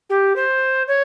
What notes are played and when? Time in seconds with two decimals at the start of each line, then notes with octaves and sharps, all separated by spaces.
0.10 G4
0.36 C5
0.88 C#5